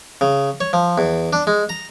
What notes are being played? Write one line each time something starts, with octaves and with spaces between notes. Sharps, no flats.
C#3
C#5
F3
E2
D4
G#3
A#5